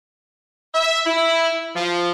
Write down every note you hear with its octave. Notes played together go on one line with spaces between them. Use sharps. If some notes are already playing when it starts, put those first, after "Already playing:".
E5
E4
F3